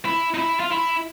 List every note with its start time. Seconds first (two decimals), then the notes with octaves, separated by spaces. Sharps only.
0.05 E4
0.34 D#4
0.38 E4
0.60 F4
0.72 E4